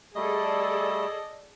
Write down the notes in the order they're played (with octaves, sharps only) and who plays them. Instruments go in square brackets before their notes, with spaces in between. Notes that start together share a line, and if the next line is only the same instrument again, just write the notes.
[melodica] G3 A3 [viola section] G#4 A4 D5 [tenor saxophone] D#5